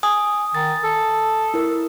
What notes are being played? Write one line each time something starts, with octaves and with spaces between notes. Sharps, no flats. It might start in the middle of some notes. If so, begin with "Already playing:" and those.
G#5 D#6
D#3 A6
A4
E4 A#4